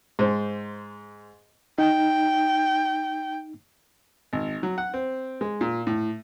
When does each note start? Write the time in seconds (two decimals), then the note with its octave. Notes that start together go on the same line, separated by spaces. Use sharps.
0.19 G#2 C5
1.78 D#4 G5
4.33 G#1
4.63 F#3
4.78 F#5
4.94 C4
5.41 G#3
5.61 A#2
5.87 A2